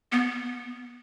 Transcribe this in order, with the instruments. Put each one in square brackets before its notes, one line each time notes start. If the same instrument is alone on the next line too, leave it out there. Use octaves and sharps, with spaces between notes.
[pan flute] B3